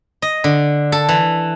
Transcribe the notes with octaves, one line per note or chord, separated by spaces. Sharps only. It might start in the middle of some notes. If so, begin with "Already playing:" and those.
D#5
D3
A4
E3